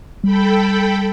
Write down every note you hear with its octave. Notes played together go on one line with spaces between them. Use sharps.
G3 A4 G5 B5